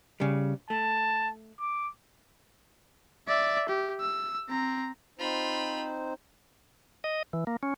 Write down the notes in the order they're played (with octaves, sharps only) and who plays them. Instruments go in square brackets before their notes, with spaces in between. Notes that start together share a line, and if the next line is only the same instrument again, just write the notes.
[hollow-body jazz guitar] C#3 G3
[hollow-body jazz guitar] A3 [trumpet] A5
[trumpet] D6
[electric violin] D5 E5
G4
E6
C4 A#5
[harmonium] C4 D#4 C5 [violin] F4 B5
[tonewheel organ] D#5
E3
A#3
C#4